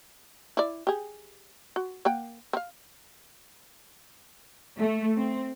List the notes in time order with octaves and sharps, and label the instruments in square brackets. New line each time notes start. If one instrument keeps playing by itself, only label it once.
[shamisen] E4 D5
G4 G#4
F#4
A#3 F#5 G5
C4 F5
[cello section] A3
C4